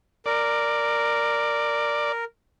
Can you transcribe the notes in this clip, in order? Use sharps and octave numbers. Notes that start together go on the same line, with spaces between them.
A#4 D5